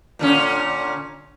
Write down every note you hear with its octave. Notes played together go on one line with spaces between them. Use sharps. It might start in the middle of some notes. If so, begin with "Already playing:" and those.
A#2 D3 C#4